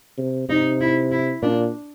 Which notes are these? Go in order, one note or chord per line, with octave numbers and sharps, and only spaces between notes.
C3
C3 D#4
E4
E4
A#2 D4